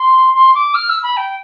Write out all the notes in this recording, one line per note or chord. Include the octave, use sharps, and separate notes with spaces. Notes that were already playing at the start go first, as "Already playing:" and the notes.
Already playing: C6
C6
D6
F6
E6
B5
G5